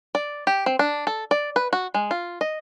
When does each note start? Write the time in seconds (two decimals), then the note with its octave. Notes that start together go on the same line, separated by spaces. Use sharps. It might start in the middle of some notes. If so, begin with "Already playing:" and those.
0.15 D5
0.47 G4
0.66 C4
0.79 D4
1.07 A4
1.31 D5
1.56 B4
1.73 F#4
1.94 G#3
2.11 F4
2.41 D#5